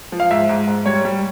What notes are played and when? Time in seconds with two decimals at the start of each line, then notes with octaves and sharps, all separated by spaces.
0.12 F3
0.20 F5
0.30 G#2 E5
0.49 G#2
0.67 G#2
0.86 G3 C#5
1.05 G3